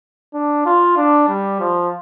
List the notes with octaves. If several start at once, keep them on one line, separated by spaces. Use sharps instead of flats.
D4
F4
D4
G3
F3